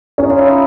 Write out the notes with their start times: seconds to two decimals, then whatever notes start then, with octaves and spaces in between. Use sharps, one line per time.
0.18 C#4 D#4
0.30 F4
0.38 E4
0.49 E4